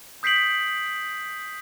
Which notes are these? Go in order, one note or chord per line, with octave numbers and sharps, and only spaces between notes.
D#6 G6 B6 C7 D7 F#7